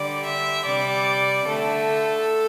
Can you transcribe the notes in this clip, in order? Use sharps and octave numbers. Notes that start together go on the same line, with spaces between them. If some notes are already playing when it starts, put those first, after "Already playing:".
Already playing: D3 G3 D5
E5
C3 G3 D5
D3 A3 A4